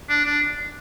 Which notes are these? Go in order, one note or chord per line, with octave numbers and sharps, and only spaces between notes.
D4
D4